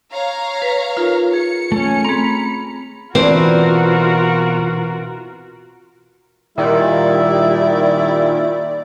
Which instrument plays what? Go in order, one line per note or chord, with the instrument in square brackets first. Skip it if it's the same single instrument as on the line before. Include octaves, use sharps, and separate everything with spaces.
[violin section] C#5 F5 A#5
[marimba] B4
D#4 F4 A#4
[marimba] G#4 [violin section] C#7
[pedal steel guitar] A3 C#4
[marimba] C4 G#4 [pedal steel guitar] A#5 B5
[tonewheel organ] B2 [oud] E3 D4 [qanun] C4 [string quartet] F4 F#4 A#4
[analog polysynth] A#2 D#3 [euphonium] G3 [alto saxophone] E4 [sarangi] D5